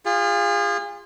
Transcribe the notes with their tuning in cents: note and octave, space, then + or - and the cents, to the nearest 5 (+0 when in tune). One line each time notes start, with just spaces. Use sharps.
F4 +0 G#4 -35